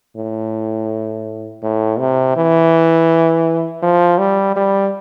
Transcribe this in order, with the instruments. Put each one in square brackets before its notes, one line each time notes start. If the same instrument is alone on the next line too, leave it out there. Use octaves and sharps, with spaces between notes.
[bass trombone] A2
A2
C3
E3
F3
G3
G3